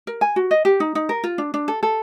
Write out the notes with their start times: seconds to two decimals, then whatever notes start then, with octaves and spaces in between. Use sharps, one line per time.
0.07 A#4
0.21 G#5
0.36 F#4
0.51 D#5
0.65 G4
0.80 D#4
0.95 D#4
1.09 A#4
1.24 F4
1.38 D4
1.54 D4
1.68 A4
1.83 A4